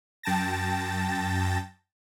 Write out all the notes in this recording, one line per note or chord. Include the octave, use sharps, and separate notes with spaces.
F#2 G5 A5 A6 A#6